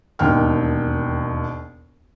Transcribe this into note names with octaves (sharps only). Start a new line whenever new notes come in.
E1 D#2 G5 F6